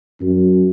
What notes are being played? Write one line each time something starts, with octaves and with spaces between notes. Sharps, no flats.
F#2